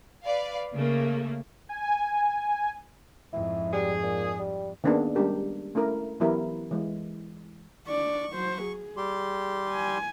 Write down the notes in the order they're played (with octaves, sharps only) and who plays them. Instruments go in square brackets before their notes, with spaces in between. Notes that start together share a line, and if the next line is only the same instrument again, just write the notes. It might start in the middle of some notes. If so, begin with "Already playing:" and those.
[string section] B4 D5 F5
C#3 A3 A#3
[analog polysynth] G#5
[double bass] F2 G#2 [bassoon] E4
[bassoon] G3 [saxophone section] G#4
[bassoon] A#2
G3
[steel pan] D#3 A#3 B3 C#4 D4 G#4
G3 G#3 C#4 D4 G4 A#4
A3 C#4 E4 A#4
E3 F#3 B3 E4 G4 A#4
E3 G#3
[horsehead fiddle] D4 D5 [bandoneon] C#6
[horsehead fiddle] F#3 C5
G#4
[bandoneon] G3 G4 C6
[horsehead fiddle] G#5